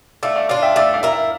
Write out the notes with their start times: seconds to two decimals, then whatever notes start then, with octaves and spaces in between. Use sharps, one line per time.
0.23 A3 D5 F5
0.36 D5 F5
0.49 D4 F4 D5 F5
0.62 E5 G5
0.76 A3 D5 F5
0.94 D5 F5
1.03 E4 A#4
1.13 E5